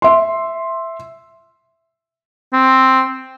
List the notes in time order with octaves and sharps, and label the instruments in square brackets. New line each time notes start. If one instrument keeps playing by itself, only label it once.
[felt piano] E5 C6
[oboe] C4